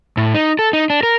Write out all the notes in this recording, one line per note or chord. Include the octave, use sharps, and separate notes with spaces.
A2
D#4
A4
D#4
D4
A#4